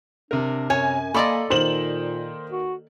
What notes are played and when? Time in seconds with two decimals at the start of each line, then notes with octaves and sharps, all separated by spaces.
0.31 C3 D4 A#4
0.70 F#2 C#5 G#5
1.14 A#3 A4 D5 D#5 B5 C6 D6
1.50 A#2 D#3 A#3 C5 E7 F#7
2.51 F#4